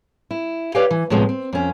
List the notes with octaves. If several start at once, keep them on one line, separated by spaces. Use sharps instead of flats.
E4
G4 B4 C#5 D5 F5 G5
E3
A2 C3 F3 G#3 B3
C4
F2 C#4